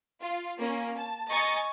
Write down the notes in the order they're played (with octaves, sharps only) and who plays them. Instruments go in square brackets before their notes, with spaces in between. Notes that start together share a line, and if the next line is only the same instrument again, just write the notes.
[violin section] F4
A#3 C#4
A5
D#5 G#5 A#5 C#6 A6 C#7